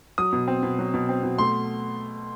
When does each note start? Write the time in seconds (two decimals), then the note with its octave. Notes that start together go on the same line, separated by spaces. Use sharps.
0.18 F#3 D#6
0.33 B2
0.48 C4
0.63 B2
0.79 F#3
0.94 B2
1.09 C4
1.23 B2
1.38 A3 C6